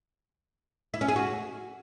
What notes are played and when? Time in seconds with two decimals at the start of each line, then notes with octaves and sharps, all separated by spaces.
0.94 E4
1.01 C#4
1.08 G#4
1.16 F#4